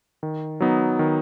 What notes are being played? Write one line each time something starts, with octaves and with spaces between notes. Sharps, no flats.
D#3
F#3 B3 D#4
D#3